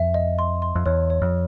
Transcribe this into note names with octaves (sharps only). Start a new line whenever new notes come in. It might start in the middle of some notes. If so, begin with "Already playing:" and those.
Already playing: F2 E5
D#5
C6
C6
F2
E2 C#5
C#5
F2